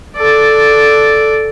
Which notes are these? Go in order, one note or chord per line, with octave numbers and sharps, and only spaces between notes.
A4 D5